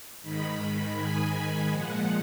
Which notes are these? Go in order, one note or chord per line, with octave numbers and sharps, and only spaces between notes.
G#2 D#3 G#3 B5
G#5
A#2 F3 G#3 F#5